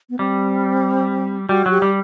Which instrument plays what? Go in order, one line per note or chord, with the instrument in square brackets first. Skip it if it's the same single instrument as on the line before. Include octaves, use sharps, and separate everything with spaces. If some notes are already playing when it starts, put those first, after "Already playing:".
[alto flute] B3
[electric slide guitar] G3 [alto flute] C4
[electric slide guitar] G3 [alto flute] F#4
[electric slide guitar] F#3
[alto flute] G4
[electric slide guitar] G3